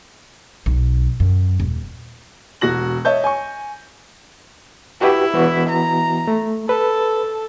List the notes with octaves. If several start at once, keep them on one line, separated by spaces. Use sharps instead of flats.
B1
F#2
D#1
E1 F#4 A#6 F#7
C#5 D#5 E5 A5 G6
G#5 C#6
E4 F#4 G4 B4
E3 B3 F#4
A#5
A3
A4 B4